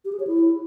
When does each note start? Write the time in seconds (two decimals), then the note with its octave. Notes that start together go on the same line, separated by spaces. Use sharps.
0.05 G4
0.12 G#4
0.20 C#5
0.27 E4